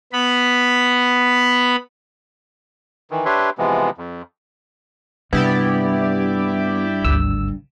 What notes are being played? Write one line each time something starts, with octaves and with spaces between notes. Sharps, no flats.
B3 B5
D#3 E3
D4 G4 B4 C#5 E5 C6
C3 E3 F3 G#3 B3
F2
G2 C3 B3 E4 G4 D5
G#1 D2 E6